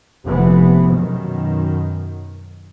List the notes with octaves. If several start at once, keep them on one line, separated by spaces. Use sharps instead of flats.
F1 E3 B3
F#2 B2 D#3